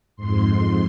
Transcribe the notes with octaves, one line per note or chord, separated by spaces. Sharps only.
F2 G#2 C6